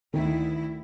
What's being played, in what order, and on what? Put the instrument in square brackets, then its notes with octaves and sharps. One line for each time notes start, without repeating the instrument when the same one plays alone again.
[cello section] D2 E4 [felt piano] D#3